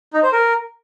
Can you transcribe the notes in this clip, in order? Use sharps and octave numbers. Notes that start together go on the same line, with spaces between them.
D#4
C5
A#4